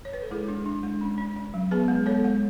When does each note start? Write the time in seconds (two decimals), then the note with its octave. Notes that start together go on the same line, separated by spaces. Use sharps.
0.05 C#5
0.13 B4
0.23 A4
0.31 G#3 E4 G#4
0.48 D4
0.66 D4
0.83 G#3
1.01 C#4
1.18 C#4
1.36 C#4
1.54 F#3
1.71 B3 G#4 B4
1.88 G#3
2.06 B3 A4 C#5
2.24 G#3